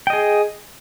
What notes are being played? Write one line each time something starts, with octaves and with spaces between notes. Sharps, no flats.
G#4 D#5 G5